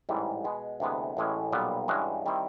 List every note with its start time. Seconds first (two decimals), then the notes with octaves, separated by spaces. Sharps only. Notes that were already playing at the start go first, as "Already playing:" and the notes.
0.09 A1 G#2 E3 G3
0.44 B2 G#3 B3
0.80 D2 C3 E3 G#3 B3
1.17 A1 A2 E3 G#3 C#4
1.52 B1 A#2 G3 B3
1.88 G2 E3 G#3 C#4 F#4
2.26 D#3 G3 C4 E4